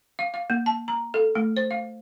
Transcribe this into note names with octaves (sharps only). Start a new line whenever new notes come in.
F5
F5
A#3
A5
A#5
A4
A3
C5
F5